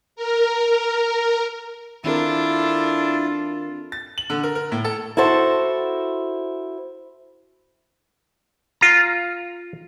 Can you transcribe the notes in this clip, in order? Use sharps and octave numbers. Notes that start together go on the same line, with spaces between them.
A#4
D#3 C4 D4 E4 F4 A4 A#4
A6
F#7
D3
A#4
A#4
A2
A4
E4 F#4 A4 C5
F4 A#5